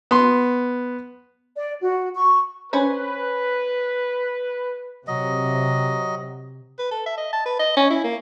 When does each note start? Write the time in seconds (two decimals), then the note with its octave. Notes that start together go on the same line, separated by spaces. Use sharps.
0.11 B3 C6
1.57 D5
1.81 F#4
2.15 C#6
2.73 C#4 B4 C5 B5
5.07 C3 F#3 D#5
6.79 B4
6.91 A4
7.06 E5
7.17 D#5
7.33 A5
7.45 B4
7.59 D#5
7.77 C#4
7.90 E4
8.04 A#3